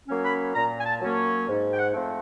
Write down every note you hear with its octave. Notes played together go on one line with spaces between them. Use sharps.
F#3 A#3 C#4
B5
A#2 A#5
G#5
A5
F#3 A#3 C#4
G#2
G5
F#5
F3 A3 C4